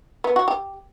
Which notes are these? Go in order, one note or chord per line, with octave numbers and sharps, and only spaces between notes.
B3
F#4
G4